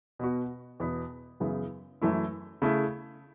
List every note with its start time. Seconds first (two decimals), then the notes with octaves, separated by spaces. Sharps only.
0.19 B2 B3 F#4
0.80 E2 B2 B3
1.40 F#2 C#3 E3 B3
2.02 F#2 E3 A3 E4
2.62 C#3 A3 E4